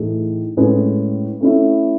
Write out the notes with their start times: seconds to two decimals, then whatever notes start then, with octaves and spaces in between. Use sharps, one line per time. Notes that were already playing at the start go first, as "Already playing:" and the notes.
Already playing: A2 E3 A3 D#4 G#4
0.57 A2 G#3 C#4 G#4 B4
1.40 A3 C#4 E4